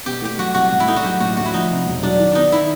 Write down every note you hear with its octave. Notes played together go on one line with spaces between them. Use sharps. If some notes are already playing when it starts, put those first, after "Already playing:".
B2 G4
A3 G4
F#3 F#4
C2 F#4
A2
E4
A3 D#4
F#4
F#3 G4
A1 F#4
D2 F#4
E4
F3 D#4
C3
E1
F#3 D4
D#3
B3 D4 D#4
D#3 E4